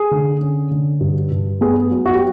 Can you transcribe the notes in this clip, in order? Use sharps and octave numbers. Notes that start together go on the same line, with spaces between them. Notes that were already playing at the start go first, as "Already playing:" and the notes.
Already playing: G#4
D3
C#4
D3
G2
G2
B3 G#4
F#3
F#4
G4